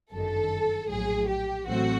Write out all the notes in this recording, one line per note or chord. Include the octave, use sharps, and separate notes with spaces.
G1 F#2 D#3 A4
A#1 A2 F#3 G#4
G4
A1 A2 F#3 A3 C4 F#4